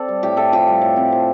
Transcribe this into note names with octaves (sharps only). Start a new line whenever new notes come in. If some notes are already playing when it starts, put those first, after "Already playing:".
Already playing: C4 A4 D5
G3
A2 G4
A2 A4
F3 G4
G3
A2
C4
F3